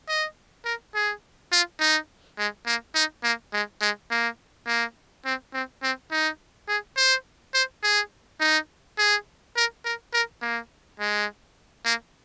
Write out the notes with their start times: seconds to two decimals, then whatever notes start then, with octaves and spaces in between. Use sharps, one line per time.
0.09 D#5
0.65 A#4
0.95 G#4
1.52 F4
1.80 D#4
2.39 G#3
2.66 A#3
2.95 D#4
3.24 A#3
3.53 G#3
3.81 G#3
4.11 A#3
4.67 A#3
5.26 C4
5.54 C4
5.83 C4
6.11 D#4
6.68 G#4
6.97 C5
7.54 C5
7.83 G#4
8.40 D#4
8.98 G#4
9.56 A#4
9.85 A#4
10.13 A#4
10.42 A#3
11.00 G#3
11.85 A#3